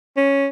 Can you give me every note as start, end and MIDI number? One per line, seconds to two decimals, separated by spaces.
0.17 0.48 61